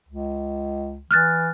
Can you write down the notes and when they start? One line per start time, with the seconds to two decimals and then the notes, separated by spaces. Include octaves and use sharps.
0.08 C#2
1.11 E3 F6 F#6 A6